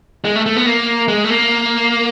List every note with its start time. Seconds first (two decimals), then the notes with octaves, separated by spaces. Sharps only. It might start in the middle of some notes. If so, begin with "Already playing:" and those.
0.25 G#3
0.36 A3
0.46 A3
0.57 B3
0.66 A#3
1.08 G#3
1.24 A3
1.30 A#3